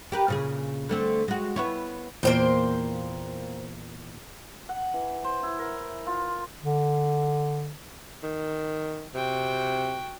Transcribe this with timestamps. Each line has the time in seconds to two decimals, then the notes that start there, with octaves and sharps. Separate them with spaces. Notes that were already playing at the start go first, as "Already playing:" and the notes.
0.12 G4 A#4 B4
0.28 A#2 C#3 G#4
0.89 D3 A3 C4
1.28 G#3 F#4
1.56 B3 E4 C#5
2.23 E2 A#2 A#3 C5 G5
4.69 F#5
4.94 E3
5.24 C5
5.43 E4
5.59 A#4
6.07 F4
6.62 D3
8.23 D#3
9.14 C3 F#4 G5